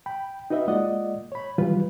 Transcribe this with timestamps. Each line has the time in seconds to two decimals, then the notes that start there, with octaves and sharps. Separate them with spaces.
0.06 G5 B5
0.50 D#4 F#4 B4 D#5 E5
0.67 G#3 A#3 F4 D5 D#5 F#5
1.32 C#5 B5
1.58 D#3 E3 F#3 G3 F4 B4